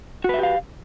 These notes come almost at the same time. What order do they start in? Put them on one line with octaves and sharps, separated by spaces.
F#4 B4 E5 G4 F5